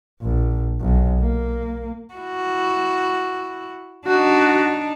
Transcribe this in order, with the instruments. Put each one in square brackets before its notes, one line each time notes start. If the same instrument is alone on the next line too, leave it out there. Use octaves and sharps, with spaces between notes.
[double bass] A#1
B1
A#3
[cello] E4 F#4
[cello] D4 D#4 [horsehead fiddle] F#4